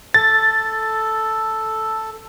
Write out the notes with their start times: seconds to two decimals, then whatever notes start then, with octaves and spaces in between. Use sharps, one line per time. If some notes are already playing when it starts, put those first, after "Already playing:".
0.14 A4 A6